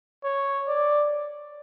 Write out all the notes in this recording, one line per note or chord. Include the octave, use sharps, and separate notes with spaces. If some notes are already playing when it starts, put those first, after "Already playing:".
C#5
D5